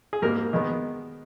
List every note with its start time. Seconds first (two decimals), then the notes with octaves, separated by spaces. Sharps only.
0.13 G#4
0.22 G#2 G3 A#3 A#4
0.53 D#3 G#3 B3